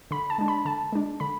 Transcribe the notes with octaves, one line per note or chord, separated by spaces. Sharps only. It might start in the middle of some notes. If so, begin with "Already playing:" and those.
D3 B5
A5
G#3 D4
B5
D3 A5
G#3 D4
D3 B5